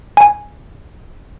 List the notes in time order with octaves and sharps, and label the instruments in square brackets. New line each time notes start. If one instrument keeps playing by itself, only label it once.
[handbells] G#5